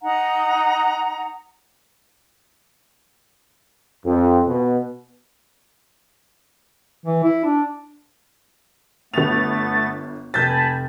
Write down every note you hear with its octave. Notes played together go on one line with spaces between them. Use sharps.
D#4 F#5 A#5
F2
B2
E3
E4
D4
G1 A3 B3 A6 F7
F1 G#5 A5 B5 G6 A6